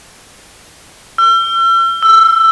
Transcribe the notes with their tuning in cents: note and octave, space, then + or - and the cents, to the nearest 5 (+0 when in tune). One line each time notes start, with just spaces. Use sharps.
E6 +45
E6 +10